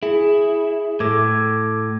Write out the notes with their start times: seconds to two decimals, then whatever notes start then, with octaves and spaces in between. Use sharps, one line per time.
0.03 E4 G#4
1.00 A2 A4 D6 G#6